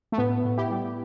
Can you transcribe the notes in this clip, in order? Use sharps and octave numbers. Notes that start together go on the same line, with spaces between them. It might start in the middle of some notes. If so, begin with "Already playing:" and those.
A3
A2 B3
A2
E4 G4
G3